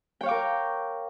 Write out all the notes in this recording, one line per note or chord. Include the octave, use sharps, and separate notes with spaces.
A#4 C#5 F5 G5 D6